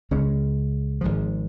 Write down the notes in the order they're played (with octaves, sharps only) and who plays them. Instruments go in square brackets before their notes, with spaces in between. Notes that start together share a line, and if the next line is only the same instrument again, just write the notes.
[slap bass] C#2 C#3 G#3 C#4
G#1 G#2 F3